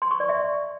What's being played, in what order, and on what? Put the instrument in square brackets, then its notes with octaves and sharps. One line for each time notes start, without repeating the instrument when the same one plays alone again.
[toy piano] C6
C#6
D5
E5